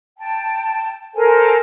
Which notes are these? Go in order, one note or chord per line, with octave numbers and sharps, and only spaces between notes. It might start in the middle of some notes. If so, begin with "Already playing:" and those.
G5 A5
A4 A#4 C5 G#5